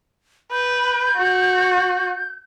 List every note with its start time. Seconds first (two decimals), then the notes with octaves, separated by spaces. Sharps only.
0.52 B4 G6
1.16 F#4